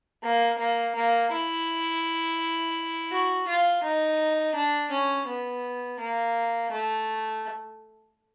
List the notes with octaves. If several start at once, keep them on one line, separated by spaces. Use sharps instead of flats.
A#3
A#3
A#3
E4
F#4
F4
D#4
D4
C#4
B3
A#3
A3